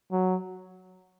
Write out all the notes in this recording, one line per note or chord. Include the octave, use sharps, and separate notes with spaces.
F#3